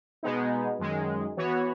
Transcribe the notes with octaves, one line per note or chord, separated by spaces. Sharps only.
B2 G#3 B3 D#4
F#2 D#3 G#3
E3 B3 F#4 C#5